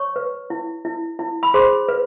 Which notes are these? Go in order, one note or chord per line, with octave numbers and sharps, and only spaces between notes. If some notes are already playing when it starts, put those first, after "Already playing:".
Already playing: C#5 C#6
B4
E4
E4
E4
B5
G#4 C5 C6
B4